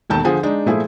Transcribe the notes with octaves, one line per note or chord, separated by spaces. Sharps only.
E1 D#2 D#3 A4 A5 G6
D3 F3 G#4
G#3 D4 D#4
A#2 F3 A3 E4 G#4